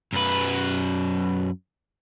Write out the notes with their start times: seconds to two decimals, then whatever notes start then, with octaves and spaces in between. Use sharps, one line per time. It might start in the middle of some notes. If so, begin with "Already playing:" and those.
0.13 F#2 B4